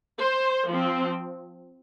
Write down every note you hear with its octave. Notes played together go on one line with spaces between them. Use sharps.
C5
F3 C4